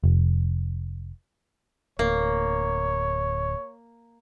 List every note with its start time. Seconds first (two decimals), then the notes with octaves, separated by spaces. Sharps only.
0.04 F1
1.99 D1 A#3 C#5